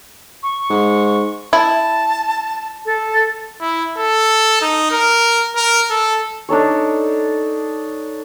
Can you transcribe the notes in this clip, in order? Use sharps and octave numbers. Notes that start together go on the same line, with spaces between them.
C#6
G#2
E4 A5
A4
E4
A4
D#4
A#4
A#4
A4
D4 D#4 A4 C#5